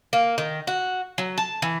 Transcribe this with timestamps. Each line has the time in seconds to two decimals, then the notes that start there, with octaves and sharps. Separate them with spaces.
0.13 A#3
0.38 D#3
0.67 F#4
1.18 F#3
1.38 A5
1.62 E3